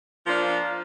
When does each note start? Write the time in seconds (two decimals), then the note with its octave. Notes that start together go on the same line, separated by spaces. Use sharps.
0.25 F3
0.27 A#3
0.30 D4